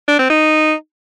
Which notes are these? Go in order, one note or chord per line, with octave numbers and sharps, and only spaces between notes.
D4
C4
D#4